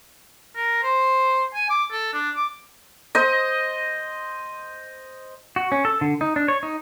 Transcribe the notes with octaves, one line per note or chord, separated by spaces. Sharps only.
A#4
C5
G#5
D6
A4
D4
D6
C5 D#5
F#4
C#4
A4
D3
D#4
D4
C#5
D#4